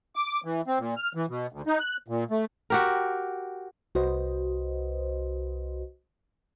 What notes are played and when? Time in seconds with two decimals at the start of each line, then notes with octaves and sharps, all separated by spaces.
0.16 D6
0.45 E3
0.67 C4
0.79 A#2
0.97 F6
1.15 E3
1.29 B2
1.52 D2
1.67 D#4
1.80 F#6
2.08 A#2
2.31 A3
2.70 F#4 G4 A#4
3.95 C2 F#4 B4 C5 D#5